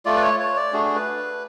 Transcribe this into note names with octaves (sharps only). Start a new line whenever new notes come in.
A3 F4 D5
B4
C#5
C#5
D5
A3 D4 F#4 G#4
G#4
B4